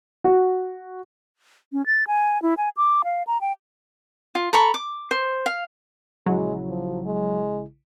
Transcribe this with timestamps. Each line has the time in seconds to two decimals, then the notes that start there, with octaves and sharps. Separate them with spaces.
0.24 F#4
1.73 C#4
1.86 A6
2.07 G#5
2.42 E4
2.58 G#5
2.77 D6
3.04 F5
3.27 A#5
3.41 G5
4.35 F4
4.53 A4 A#5 B5 C#6
4.74 D6
5.11 C5
5.46 F5
6.26 A#1 C#3 F#3 G#3 E4
6.69 F3
7.05 G#3